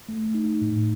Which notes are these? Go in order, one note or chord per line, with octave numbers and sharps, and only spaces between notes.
A3
D#4
A2